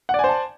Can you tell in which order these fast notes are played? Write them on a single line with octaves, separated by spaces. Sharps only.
F#5 D5 G#5 C5 A5